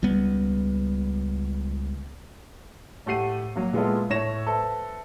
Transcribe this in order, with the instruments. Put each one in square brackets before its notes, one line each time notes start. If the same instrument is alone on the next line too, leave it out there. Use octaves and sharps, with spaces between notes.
[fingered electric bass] C#2 G3 B3
[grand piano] A2 A3 G4 F#5 C7 D#7
F#3 A#3
A#2 G#3 B3 E4 F4 A4
A2 A3 E4 C#5 A#6 E7
A4 B4 C5 E5 A5